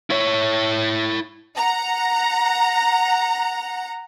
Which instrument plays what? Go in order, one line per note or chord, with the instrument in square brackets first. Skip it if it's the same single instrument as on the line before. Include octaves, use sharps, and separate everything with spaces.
[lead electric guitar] E4 C#5
[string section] F#5 A#5